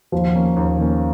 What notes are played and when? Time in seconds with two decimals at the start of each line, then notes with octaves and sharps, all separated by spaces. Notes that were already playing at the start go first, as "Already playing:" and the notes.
0.12 D#2 F3
0.35 D#3 A#3 C#4
0.56 D#2
0.78 D#3 A#3 C#4